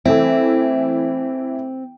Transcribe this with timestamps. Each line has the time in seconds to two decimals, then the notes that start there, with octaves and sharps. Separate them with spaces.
0.05 E3 A3 C4 E4